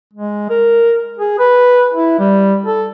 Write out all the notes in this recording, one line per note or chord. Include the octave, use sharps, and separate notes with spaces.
G#3
A#4
G#4
B4
E4
G3
A4